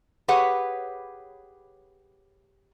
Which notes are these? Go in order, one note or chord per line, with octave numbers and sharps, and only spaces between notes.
G4 G#4 B4 C#5 F#5